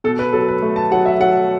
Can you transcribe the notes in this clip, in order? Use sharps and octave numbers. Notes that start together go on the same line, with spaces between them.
B2 A4
B4
F#3 A4
B4
A3
A5
F#3 F#5
E5
F#3 F#5